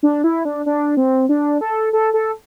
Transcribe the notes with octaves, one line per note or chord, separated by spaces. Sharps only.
D4
E4
D4
D4
C4
D4
A4
A4
A4